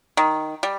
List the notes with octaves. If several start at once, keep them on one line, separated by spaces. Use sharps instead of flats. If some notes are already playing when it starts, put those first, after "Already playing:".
D#3
G3